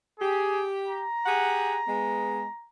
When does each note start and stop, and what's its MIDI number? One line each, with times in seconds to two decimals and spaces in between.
0.20 1.03 67
0.20 0.65 68
0.88 2.69 82
1.25 1.79 67
1.25 1.79 68
1.25 1.79 78
1.87 2.45 56
1.87 2.45 59